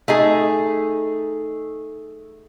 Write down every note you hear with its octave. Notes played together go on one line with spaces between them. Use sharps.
A3 D#4 G#4